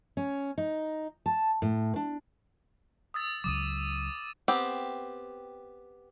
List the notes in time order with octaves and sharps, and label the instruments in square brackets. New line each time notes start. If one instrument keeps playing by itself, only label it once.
[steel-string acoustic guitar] C#4
D#4
A5
A2
D4
[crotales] D#6 E6 A6
[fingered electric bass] C#2 C#3 F#3 [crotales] D6 D#6 D#7
[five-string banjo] B3 C4 G4